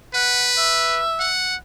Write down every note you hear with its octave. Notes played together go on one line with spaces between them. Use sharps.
B4 F#5
E5
F#5